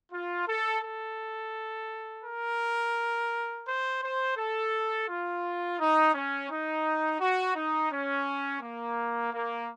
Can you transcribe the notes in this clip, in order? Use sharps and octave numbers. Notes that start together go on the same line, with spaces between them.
F4
A4
A4
A#4
C5
C5
A4
F4
D#4
C#4
D#4
F#4
D#4
C#4
A#3
A#3